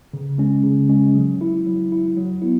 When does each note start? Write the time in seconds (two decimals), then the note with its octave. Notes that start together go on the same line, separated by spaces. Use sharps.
0.14 C#3
0.38 G#3 C#4
0.64 C#3
0.89 G#3 C#4
1.14 F#3
1.41 E4
1.66 F#3
1.92 E4
2.17 F#3
2.42 B3 E4